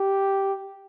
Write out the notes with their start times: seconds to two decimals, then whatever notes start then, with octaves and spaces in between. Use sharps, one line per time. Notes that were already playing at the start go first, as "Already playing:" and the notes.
Already playing: G4